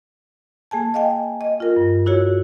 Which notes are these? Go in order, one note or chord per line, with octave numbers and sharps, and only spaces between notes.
A#3 G#4 G#5 A5
D#5 F5 G5 G#5
D#5
F4 A#4
G2
E4 F#4 G#4 C#5